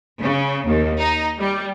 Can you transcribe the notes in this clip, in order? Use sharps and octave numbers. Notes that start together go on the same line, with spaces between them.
C#3
D#2
D#4
G3